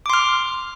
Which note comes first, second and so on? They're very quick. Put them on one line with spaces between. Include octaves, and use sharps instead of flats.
D6 C6 F6